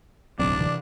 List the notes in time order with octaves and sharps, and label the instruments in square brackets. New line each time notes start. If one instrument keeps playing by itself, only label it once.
[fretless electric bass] D1 B1 E2 [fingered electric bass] F#3 C4 [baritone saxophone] D4 [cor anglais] D5
[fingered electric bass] C3 E3